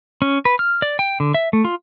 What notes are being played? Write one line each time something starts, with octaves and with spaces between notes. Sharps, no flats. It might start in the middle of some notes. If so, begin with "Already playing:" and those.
C#4
B4
F6
D5
G5
D3
E5
A3
F4